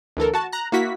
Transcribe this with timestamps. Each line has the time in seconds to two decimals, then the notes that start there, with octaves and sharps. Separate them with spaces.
0.17 D2 E3 A4 A#4
0.34 F#4 A5
0.52 A#5 F#6
0.72 A#3 E4 F#4 B6